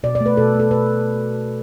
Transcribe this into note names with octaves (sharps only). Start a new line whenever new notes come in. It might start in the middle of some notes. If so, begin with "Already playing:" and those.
B2 D5
D5
A3
B4
B2 A4
A3
A4
B2 B4